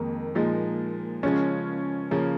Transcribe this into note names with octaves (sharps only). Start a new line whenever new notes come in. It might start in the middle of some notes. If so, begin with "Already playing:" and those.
Already playing: F2 D#3 G#3 A#3 D#4
A#2 F3 G#3 D#4
C#3 F3 G#3 C#4
C#3 F3 A#3